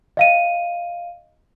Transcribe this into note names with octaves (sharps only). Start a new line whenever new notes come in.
D#5 F5 D#7